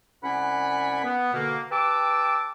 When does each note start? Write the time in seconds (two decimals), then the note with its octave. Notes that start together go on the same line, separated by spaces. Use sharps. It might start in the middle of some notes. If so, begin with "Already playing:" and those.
0.23 C2 C#4 D5 F#5 G#5 B5
1.03 B3
1.33 B2 D3 A#3
1.71 G4 B4 G5 A5 D6 E6